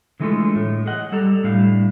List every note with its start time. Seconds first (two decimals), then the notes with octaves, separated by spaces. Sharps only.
0.20 D3 E3 G#3 A3 F4 A4
0.55 A2
0.86 G#4 D#5 F#5
1.12 G3 A4 D5 A#5
1.44 A2 G3 D4 F5